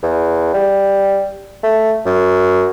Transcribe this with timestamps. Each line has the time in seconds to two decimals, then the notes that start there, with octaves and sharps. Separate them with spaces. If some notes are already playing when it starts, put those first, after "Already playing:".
0.03 E2
0.54 G3
1.63 A3
2.06 F#2